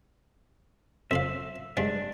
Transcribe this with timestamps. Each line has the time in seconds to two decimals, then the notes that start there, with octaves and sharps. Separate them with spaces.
1.11 F2 F3 E5 F5
1.77 G2 G#3 D4